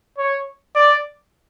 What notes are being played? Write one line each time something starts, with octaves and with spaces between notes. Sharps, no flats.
C#5
D5